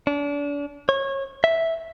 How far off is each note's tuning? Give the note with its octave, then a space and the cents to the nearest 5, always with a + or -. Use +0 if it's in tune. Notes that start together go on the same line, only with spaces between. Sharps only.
D4 -35
C#5 -25
E5 -5